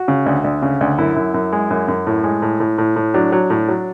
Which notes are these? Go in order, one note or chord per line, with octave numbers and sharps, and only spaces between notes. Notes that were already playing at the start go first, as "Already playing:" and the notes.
Already playing: F#4
C#3
D2
D2
C#3
D2
F#2 E4
F#2
F#2
G#3
F#2
F#2
A2
G#3
A2
A2
A2
A2
F#3 D4
F#3
A2
F#3